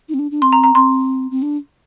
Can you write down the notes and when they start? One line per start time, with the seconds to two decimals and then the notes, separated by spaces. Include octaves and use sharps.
0.09 D#4
0.14 C4
0.19 D4
0.31 D4
0.42 C4 C6
0.53 A#5
0.64 A#5
0.75 C4 C6
1.31 C4
1.42 D4